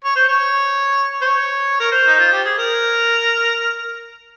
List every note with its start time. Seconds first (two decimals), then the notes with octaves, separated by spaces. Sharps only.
0.05 C#5
0.16 C5
0.29 C#5
1.21 C5
1.24 C#5
1.80 A#4
1.92 C5
2.07 D#4
2.19 F4
2.32 G4
2.45 G#4
2.58 A#4